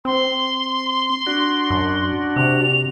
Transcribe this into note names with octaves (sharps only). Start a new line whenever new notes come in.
C4 C6
D4 F#4
F#2
C3 F7